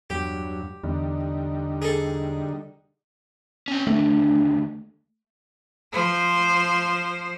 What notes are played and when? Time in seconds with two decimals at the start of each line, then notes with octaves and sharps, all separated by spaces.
0.10 E2 G2 F#3 G4
0.83 E2 D3 G3 D#4
1.82 G#4 A4
3.68 C4 C#4 G5
3.87 D#2 D3 A3 D4
5.93 F3 C5